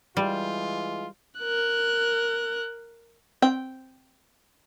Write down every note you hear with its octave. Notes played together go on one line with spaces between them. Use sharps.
E3 G3 G#3 F4
A#4 F#6
C4 G5